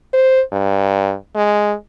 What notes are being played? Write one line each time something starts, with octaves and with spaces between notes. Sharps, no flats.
C5
G2
G#3